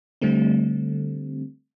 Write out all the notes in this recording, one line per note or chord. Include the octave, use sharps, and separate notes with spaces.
D3 G3 A3 C4